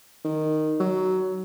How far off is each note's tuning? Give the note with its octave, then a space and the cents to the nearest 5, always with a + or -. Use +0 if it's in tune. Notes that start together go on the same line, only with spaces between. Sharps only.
D#3 -5
F#3 +15